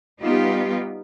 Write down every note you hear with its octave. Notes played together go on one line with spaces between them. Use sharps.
G3 B3 D#4 F4 G4